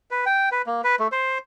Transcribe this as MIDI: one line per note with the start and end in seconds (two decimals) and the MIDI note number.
0.11 0.25 71
0.26 0.49 79
0.52 0.62 71
0.66 0.81 58
0.84 0.96 71
1.00 1.07 57
1.12 1.38 72